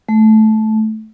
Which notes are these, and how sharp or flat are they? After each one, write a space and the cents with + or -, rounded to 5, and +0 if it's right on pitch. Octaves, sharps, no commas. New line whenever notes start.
A3 -15